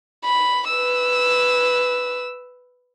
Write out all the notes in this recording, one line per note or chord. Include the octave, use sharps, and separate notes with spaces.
B5
B4 E6